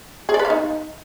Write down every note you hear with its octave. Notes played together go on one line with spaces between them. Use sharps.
G#4
D5
B4
F5
D#4